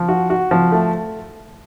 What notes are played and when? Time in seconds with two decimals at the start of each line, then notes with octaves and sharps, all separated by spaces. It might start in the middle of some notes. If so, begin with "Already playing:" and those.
Already playing: F3
0.09 F#4
0.30 F#4
0.51 F3
0.72 A3